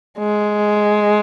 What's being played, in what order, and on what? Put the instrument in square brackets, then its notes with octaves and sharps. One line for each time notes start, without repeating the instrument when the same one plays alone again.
[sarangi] G#3